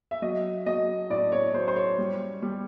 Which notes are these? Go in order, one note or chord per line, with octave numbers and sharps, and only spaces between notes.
E5
F#3 D#5
F#3 D#5
A2 D5
C#5
F#3 C5
C5
C#5
G3
G3